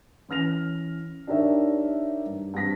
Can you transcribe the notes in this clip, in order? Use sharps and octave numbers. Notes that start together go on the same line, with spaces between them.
E3 C#4 F6 A#6 F7
D4 D#4 G4 A#4 C#5 E5
G2
G2 C4 A#6 B6